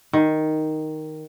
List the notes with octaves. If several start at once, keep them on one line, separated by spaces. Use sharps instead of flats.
D#3